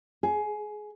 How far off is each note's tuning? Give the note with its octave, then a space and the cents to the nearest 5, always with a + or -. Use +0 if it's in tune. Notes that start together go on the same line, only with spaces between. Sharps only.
G#4 +20